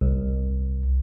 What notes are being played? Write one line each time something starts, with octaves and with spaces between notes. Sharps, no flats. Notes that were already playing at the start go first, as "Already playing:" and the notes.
C2